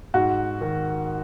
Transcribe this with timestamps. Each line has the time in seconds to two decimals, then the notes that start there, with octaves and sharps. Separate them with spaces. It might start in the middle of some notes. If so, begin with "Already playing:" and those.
0.14 G#2 F#4
0.61 D#3